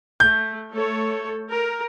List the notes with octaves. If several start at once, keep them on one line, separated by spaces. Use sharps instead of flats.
A3 G6
A3 A4 C#5
A#4